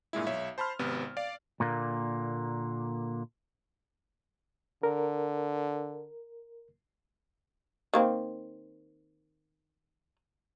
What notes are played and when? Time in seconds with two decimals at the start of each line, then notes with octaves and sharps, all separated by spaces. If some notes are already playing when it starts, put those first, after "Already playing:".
0.13 G2 A#2 G#3 E4
0.27 B1 C#5 E5
0.58 C5 A5 B5 C6 F6
0.79 G#1 C3 B3
1.17 D5 F5
1.60 A#2 D3 A#3
4.83 D3 A#4
7.94 D#3 A#3 C4